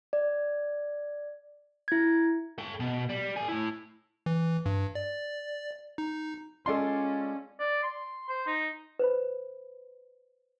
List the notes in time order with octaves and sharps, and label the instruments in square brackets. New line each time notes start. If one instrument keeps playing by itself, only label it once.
[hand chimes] D5
E4 G#6
[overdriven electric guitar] A4 G5
B2
G3
A4 G#5
A3 E4
[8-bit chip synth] E3
G2
D5
D#4
[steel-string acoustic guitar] G#3 F4 [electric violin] C#4 [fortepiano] A4 D5 C6
[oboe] D5
C6
C5
D#4
[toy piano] B4 C5 B5